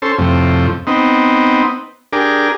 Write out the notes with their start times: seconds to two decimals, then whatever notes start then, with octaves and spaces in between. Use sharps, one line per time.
0.02 C#4 A4 C5
0.18 F2 A2 C3
0.87 B3 C4 D#4
2.13 D4 G4 G#4 A#4